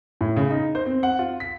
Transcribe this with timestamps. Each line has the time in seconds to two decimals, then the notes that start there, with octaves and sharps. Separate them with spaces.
0.21 A2
0.37 C#3
0.51 D#4
0.75 C5
0.86 C4
1.03 F#5
1.19 F4
1.40 B6